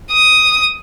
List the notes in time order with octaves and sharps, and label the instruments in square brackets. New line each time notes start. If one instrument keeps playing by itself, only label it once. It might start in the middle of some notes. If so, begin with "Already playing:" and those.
[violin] D#6